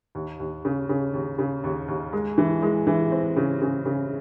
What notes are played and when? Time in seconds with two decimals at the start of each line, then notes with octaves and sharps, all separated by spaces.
0.15 D#2
0.40 D#2
0.65 C#3
0.89 C#3
1.14 D#2
1.39 C#3
1.64 D#2
1.88 D#2
2.13 G#3
2.38 E3
2.62 G#3
2.87 E3
3.12 C4
3.37 C#3
3.62 C#3
3.86 C#3